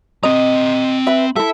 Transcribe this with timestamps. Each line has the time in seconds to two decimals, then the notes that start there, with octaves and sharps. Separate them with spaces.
0.23 C4 D#5 A#5
1.06 B4 E5 B5
1.36 E4 A4 E5